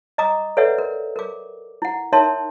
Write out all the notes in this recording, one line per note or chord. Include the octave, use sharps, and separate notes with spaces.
D#5 A#5 D6 D#6
A4 B4 C#5 D5 E5 F#5
A#4
A#4 D6
E4 F#5
D#4 A#4 C#5 E5 A5 C6